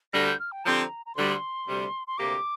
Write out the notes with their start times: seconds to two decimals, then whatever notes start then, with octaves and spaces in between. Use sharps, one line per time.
0.13 D2 D3 G3 D4 A#6
0.26 G6
0.40 F6
0.52 G5
0.64 D3 F3 C4 G4 A#5
1.06 A#5
1.15 D2 D3 G3 C6
1.67 D2 C3 G3
2.07 C6
2.18 D2 C3 A#3 G4 D6